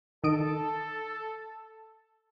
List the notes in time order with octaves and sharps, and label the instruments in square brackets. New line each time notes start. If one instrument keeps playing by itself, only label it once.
[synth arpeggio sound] D#3 D#5 D7 [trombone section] A4